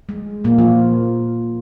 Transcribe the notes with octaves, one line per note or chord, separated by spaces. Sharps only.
G#3
A#2 A#3
F3 F4